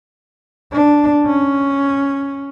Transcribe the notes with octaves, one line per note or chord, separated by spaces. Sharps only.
D4
C#4